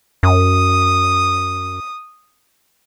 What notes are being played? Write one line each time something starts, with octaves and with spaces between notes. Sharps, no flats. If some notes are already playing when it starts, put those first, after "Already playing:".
F#2 D#6